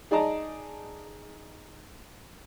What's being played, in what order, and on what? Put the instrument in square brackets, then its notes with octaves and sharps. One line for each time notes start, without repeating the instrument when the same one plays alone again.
[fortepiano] D#4 G#4 D5 D#5 A5 A#5